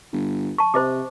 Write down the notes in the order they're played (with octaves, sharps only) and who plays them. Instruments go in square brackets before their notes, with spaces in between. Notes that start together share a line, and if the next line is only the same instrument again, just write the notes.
[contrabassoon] G1
[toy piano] A5 C#6
[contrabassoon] C3 [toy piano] C5 D#5 D6